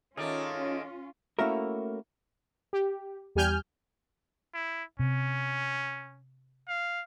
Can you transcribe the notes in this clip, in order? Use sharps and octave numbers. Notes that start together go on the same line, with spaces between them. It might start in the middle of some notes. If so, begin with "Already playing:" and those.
D#3 A3 C#4 F4 G#4 A#4 C#5 D5
A3 A#3 C#4 E4 F#4 A#4
G4
E2 G3 G4 G#5 F6 G6
E4
C3 C#4
F5